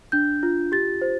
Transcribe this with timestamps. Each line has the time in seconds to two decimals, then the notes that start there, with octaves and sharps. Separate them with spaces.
0.12 D4 G6
0.43 F4
0.72 G4 A6
1.02 C5